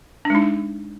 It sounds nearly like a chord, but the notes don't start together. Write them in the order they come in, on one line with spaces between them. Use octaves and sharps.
D4 G#3 D#4